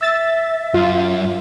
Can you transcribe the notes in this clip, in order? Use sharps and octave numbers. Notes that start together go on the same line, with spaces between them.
E5 E6 A6
F#2 F4